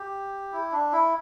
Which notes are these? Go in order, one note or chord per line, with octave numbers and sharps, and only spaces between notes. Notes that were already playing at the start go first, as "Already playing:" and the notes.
Already playing: G4
E4
D4
E4